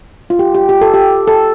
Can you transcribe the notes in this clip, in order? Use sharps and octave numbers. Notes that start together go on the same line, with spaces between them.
F4
G4
G4
G4
A4
G4
A4